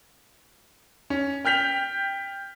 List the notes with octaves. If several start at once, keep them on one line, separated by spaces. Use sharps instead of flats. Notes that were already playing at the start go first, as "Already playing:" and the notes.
C#4
G5 F6 G6 B6 F7